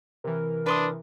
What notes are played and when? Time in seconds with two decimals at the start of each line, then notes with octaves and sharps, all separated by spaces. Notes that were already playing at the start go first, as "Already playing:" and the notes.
0.24 C3 E3 A#4
0.66 D4 B4 C6 D#6